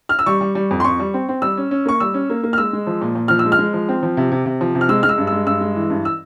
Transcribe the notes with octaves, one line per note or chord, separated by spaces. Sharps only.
F6
E6
G3 C#6
G3
G3
F2
C6
F2 C#6
G3
C4
C4
G3 E6
C#4
C#4
A#3 C#6
G3 E6
C#4
A#3
A#3
F6
G#3 E6
G#3
F3
A#2
A#2
F3 F6
E6
G#3
F6
G#3
F3
C4
F3
C3
C3
C3
F3
C3
F6
G#3 E6
G#3 F6
E6
G2
G#3 E6
G2 E6
G#3
E3
G2
E6